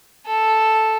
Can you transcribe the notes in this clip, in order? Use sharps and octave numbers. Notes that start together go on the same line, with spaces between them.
A4